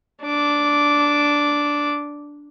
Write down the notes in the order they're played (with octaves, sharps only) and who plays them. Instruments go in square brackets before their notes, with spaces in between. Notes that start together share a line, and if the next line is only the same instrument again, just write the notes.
[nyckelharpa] D4 D6